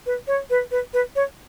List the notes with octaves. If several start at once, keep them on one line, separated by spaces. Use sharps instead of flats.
B4
C#5
B4
B4
B4
C#5